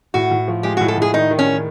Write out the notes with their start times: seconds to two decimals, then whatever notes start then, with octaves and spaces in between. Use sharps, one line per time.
0.14 A2 F#4
0.31 A2
0.48 F3
0.63 G#3 G4
0.77 F#4
0.81 A2
0.88 A4
0.98 A2 G#4
1.13 D#3 D#4
1.31 D#3
1.39 C#4
1.46 D#3